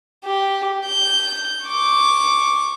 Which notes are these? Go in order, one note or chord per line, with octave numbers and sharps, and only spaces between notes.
G4
G6
C#6 D6